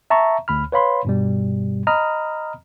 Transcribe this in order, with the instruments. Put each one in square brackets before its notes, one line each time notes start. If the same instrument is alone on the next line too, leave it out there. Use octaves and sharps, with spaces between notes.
[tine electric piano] E5 A5 A#5 C#6
D2 B5 F6
B4 C#5 F5 B5 C6
G2 B2 G3
D#5 A#5 B5 D#6 F6